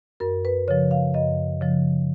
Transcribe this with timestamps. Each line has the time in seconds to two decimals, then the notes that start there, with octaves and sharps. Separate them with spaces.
0.20 F#2 A#4
0.45 B4
0.68 C#3 F3 C#5
0.91 F5
1.14 F#2 D#5
1.61 C#3 F3